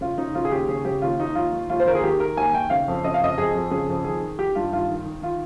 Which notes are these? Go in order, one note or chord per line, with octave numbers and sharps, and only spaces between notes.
C#3 F4
C#3 D#4
C#3 F4
G#4
D#2 G4
C#3 G#4
C#3 G4
D#2 F4
D#2 D#4
D#2 F4
D#3
D#2 F4
C5
D#2 A#4
G#4
D#3 G4
D#3 A#4
D#2 G#5
D#3 G5
C#3 F5
F2
C#3 D#5
F5
F2 D#5
F2 G#4
F2
C#3 G#4
F2
D#3 G#4
D#3
D#3 G4
G2 F4
D#3 F4
D#3
D#3
D#3 F4